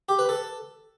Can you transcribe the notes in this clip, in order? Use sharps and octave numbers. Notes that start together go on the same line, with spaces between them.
G4
B4
A4